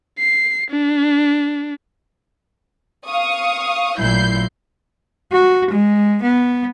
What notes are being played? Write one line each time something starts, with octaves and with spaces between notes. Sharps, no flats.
C7
D4
F5 C#6 D#6
A1 A#2 F#3 E4 G6 C7
F#4
G#3
B3